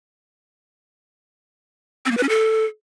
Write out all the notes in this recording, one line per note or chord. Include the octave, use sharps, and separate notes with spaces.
C4
A#3
B4
C#4
A4